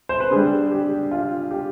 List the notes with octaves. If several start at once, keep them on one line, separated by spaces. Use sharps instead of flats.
C5
B4
D3 G3 G#4
G4
F4
G4